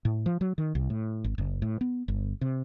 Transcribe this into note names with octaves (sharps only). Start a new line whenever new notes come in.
A2
F3
F#3
D#3
C2
A2
G#1
F#1
A2
B3
G1
C3